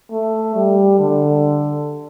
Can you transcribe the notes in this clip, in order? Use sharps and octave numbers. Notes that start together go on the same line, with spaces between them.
A3
G3
D3